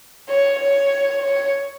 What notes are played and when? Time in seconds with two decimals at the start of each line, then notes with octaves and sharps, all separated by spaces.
0.29 C#5
0.59 C#5
1.22 C#5